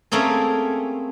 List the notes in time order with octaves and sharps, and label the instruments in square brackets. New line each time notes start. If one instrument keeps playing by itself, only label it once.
[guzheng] A3 A#3 C4 C#4 G#4